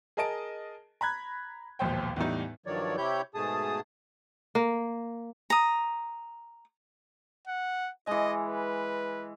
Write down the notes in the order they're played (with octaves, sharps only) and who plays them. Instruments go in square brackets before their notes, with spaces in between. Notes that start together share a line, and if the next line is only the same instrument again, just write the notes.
[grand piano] G#4 A#4 D#5 A5 D7
A#5 B5 F#6 G#6
E1 A#1 D#2 C5 G5
E2 A2 G3 D#4
[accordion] G2 D#3 F3 F#3 C#5 D5
C3 E4 G4 C#5 G6
G#2 B2 A3 G#4 A5 D#6
[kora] A#3
[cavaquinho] A#5 D#6
[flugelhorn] F#5
[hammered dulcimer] E3 G#3 [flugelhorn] D#5
[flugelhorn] B4